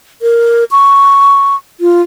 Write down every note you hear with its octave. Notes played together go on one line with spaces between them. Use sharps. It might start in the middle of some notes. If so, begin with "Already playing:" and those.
A#4
C#6
F4